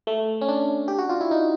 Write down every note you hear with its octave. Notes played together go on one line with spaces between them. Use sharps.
A3
C#4
D4
G4
F#4
F4
E4
D#4